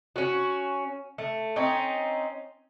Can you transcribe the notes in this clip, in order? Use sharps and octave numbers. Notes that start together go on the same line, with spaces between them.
C#4 F#4
A3
C4 C#4 D#4